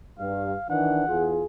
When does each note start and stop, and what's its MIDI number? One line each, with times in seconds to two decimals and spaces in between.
0.19 0.54 43
0.19 0.68 77
0.70 1.03 51
0.70 1.03 52
0.70 1.03 62
0.70 1.33 78
1.08 1.44 40
1.08 1.44 65
1.08 1.44 68